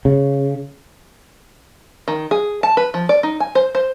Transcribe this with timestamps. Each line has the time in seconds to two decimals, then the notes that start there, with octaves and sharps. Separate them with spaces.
0.05 C#3
2.08 D#3
2.31 G#4
2.63 A5
2.77 B4
2.94 F3
3.09 D5
3.23 D#4
3.40 G#5
3.55 C5
3.75 C5